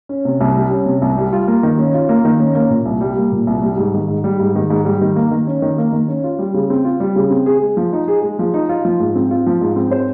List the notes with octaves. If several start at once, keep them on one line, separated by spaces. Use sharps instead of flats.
C#4
C3
C2
G3
C#4
C3
C2
G3
F4
A#3
D#3
C#4
F4
A#3
D#3
C#4
A#3
A#2
C2
G3
A#3
A#2
C2
G3
G#2
D#3
G#2
G3
G#2
D#3
G#2
G3
D#3
A#3
D#3
C#4
D#3
A#3
D#3
C#4
F4
G3
C#3
C4
F4
G3
C#3
C4
G#4
G#3
F3
D#4
G#4
G#3
F3
D#4
F4
F3
G#2
C4
F4
F3
G#2
C4
C5